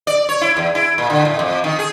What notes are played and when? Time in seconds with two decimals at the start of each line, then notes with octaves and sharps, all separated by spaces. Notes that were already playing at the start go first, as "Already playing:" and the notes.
0.07 D5
0.29 C#5
0.41 E4
0.57 E2
0.75 E4
0.98 A#2
1.10 D3
1.25 A2
1.39 F2
1.64 D#3
1.79 G#4